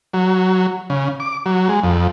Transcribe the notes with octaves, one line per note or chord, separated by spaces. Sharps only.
F#3
C#3
D6
F#3
G#3
F2